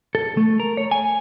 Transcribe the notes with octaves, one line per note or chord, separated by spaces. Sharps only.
A4
A3
A#4
C#5
G#5